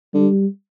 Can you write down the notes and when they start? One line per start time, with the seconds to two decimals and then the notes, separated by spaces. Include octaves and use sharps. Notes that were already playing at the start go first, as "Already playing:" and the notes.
0.14 D3 G3